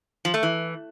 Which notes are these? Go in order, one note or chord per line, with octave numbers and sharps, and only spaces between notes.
F3
A3
E3